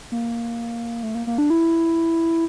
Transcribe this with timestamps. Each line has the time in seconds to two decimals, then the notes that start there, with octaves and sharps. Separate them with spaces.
0.12 A#3
1.03 A3
1.15 A#3
1.27 A#3
1.38 D4
1.50 E4